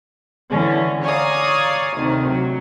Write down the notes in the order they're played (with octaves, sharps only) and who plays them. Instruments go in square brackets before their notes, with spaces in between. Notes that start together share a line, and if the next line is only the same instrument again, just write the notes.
[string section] D3 E3 C#4
C#5 D5 F5 G#5 A#5 D#6
D2 C3 D#3
F#3